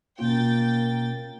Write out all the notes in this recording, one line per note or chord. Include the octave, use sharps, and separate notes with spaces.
B2 A#3 C#4 F4 G5 A6